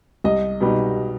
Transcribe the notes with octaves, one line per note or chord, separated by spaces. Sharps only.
C2 D#5
B2 G3 D#4